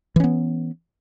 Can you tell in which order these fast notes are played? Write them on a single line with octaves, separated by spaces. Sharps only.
E3 C#4 B3